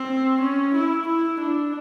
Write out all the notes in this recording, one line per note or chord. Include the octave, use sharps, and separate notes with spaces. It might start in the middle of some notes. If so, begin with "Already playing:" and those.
Already playing: C4
C#4
E4
E4
D4